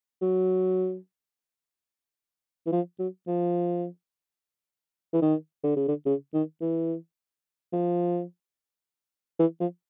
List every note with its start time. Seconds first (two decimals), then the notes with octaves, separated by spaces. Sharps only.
0.21 F#3
2.66 E3
2.72 F3
2.99 F#3
3.27 F3
5.13 E3
5.22 D#3
5.64 D3
5.76 C#3
5.88 D3
6.06 C#3
6.34 D#3
6.61 E3
7.73 F3
9.39 E3
9.60 F3